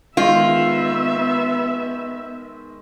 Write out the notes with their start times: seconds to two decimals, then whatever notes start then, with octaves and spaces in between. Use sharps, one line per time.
0.17 D#3 G#3 B3 F4 E5